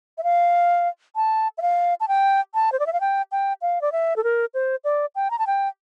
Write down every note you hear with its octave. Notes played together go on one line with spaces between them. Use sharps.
E5
F5
A5
E5
F5
A5
G5
A5
C5
D5
E5
F5
G5
G5
F5
D5
E5
A4
A#4
C5
D5
G5
A#5
A5
G5